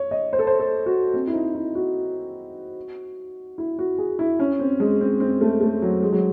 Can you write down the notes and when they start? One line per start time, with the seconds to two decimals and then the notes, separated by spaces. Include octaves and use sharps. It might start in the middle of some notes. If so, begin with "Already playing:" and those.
Already playing: C#5
0.11 D#5
0.33 C5
0.39 A4
0.47 C5
0.60 A4
0.86 F#4
1.14 C4
1.27 E4
1.33 D#4
1.55 E4
1.75 F#4
3.58 E4
3.79 F#4
3.98 G#4
4.19 E4
4.39 C#4
4.59 C4
4.80 G#3
5.01 C4
5.20 C4
5.41 A3
5.61 A3
5.82 F#3
6.02 G#3
6.13 F#3